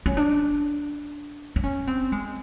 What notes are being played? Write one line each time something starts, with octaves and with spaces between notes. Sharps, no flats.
C#4
D4
D4
C#4
C4
G#3